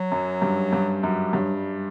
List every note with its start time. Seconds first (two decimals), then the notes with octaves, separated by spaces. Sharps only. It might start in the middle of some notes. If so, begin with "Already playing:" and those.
Already playing: F#3
0.12 F#2
0.42 G2
0.73 G2
1.03 F#2
1.33 G2 F#3
1.56 G3